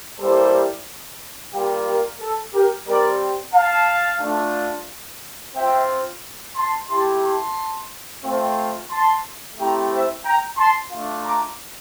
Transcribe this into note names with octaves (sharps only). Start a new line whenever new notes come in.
G3 A#3 E4 G4 A4 C5
G3 A#3 F4 G4
G4 A#4
A4
G4 A#4
G3 C4 G4 A#4 D5
F5 A5
A3 D4 F4
C4 F4 E5 G5
A5 C6
A3 E4 G4 A5 C6
A5 C6
A3 C4 F4
A5 C6
A3 C4 E4 G4 G5 A#5
C5 E5
G5 A#5
A5 C6
A3 D4 F4
A#5 D6